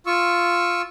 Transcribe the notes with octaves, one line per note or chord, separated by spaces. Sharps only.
F4 C#6 E6